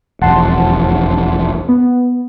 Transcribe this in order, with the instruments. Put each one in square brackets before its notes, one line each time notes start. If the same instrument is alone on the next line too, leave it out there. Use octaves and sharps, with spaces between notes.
[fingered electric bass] E1 A1 F2 [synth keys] F#5 A5 C6
[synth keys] B3